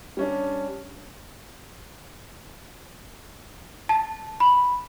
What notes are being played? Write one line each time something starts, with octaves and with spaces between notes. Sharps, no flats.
G3 C#4 D4
A5
B5